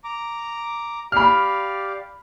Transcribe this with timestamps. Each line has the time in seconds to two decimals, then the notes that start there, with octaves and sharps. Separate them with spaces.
0.04 A#5 D6
1.12 G4 D5 F5 B5 F6